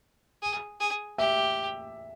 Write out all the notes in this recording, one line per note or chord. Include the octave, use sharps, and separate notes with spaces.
G#4
G#4
G4 E5